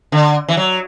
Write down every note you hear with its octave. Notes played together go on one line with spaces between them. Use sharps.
D3
E3
F#3